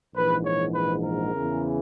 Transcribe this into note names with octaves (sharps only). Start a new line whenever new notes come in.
A#1 G#2 E3 B4
C#5
B4
A#4
E2 C#3 E3